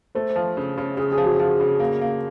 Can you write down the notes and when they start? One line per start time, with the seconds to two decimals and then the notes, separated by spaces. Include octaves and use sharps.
0.15 A3 C5
0.36 F3
0.57 C#3
0.78 C#3
0.97 C#3 G#4
1.12 G#4
1.18 F3
1.24 F#4
1.39 F3
1.60 C#3
1.79 A#3
2.01 A#3